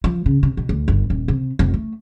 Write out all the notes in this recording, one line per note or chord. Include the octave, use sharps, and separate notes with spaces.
F3
C#3
C3
B2
D2
G1
D#1
C3
F1
A3